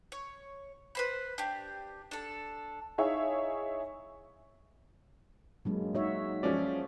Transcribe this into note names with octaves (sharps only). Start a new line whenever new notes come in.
C#5
B4 C5 B5
D4 G4
D4 A4
D#4 E4 G#4 C#5 E5 F5
G2 F#3 G#3 A#3
D#4 F#4 C#5 E5
F3 G#3 C#4 D5